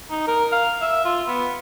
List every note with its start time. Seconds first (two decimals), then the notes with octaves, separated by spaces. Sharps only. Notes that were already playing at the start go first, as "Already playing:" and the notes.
0.11 D#4
0.27 A#4
0.52 F5
0.81 E5
1.05 F4
1.27 B3